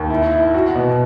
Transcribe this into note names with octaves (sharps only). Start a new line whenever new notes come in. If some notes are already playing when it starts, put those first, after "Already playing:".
Already playing: D#2
E4
E4
F#4
B2